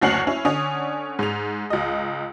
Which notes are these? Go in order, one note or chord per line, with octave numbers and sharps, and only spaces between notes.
F#1 D2 C#4 F#5 C7 F#7
C#4 E4
D3 C#4 D#6 F7
G#2 F7
C#2 D#5